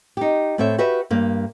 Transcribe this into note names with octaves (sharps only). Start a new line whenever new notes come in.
D#4 G4
A2 C4 A4 C#5 E5
F#4 G4 B4 E5
G2 A#3